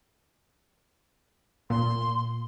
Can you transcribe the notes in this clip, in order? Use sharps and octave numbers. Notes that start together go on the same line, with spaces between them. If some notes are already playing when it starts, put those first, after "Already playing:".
A#2 C6